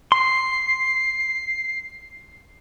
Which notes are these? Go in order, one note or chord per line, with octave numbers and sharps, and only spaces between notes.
C6 C7